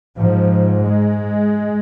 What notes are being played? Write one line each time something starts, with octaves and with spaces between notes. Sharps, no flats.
G#2 F3
G#3